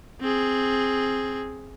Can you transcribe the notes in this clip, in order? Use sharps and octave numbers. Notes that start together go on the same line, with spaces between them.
C4 G#4